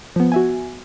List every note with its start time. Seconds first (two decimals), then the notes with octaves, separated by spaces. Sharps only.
0.16 F3 B3
0.32 F#4 E5 G#5